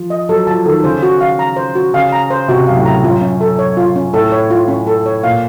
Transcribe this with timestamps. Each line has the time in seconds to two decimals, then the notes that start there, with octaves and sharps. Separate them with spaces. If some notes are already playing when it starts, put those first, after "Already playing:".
Already playing: F3
0.10 D#5
0.29 F#3 A4
0.47 F3 A5
0.66 D#3 A4
0.84 C#3 C5
1.03 F#4
1.21 F5
1.39 A#5
1.57 C5
1.75 F#4
1.94 C#3 F5
2.13 A#5
2.30 C5
2.48 C3 F#4
2.67 F#2 F5
2.76 A2
2.86 A#5
3.04 F#2 F4
3.22 C#4
3.41 A4
3.59 C#5
3.77 F4
3.96 C#4
4.14 A2 A4
4.32 C#5
4.50 F4
4.68 C#4
4.87 A4
5.06 C#5
5.24 A#2 F5